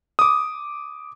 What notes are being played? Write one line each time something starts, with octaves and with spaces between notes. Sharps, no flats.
D6 D#6